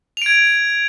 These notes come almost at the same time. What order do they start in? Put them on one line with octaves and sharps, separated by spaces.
F7 D7 G#6